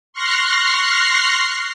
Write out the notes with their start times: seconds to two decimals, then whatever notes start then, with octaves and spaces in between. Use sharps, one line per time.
0.13 C6 C#6 F6 F#6 A#6 C7